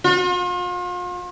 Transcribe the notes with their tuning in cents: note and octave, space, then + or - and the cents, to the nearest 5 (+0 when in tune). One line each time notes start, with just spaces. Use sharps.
F4 +40